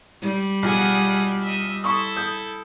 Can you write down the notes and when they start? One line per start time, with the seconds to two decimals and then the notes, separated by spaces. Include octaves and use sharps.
0.22 G3
0.63 B1 F3 G#4 F#5
1.42 D#5 E5
1.84 E4 A4 C6 C#6 D#6
2.17 D#6 G6